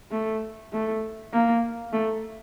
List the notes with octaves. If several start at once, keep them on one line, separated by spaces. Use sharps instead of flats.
A3
A3
A#3
A3